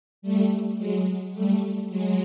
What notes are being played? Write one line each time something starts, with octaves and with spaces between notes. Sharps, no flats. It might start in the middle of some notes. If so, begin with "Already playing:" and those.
G3 A3
F#3 G#3
G3 A3
F#3 G#3